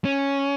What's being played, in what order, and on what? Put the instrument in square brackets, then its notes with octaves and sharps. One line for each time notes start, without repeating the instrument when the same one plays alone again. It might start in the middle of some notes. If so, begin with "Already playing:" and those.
[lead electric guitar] C#4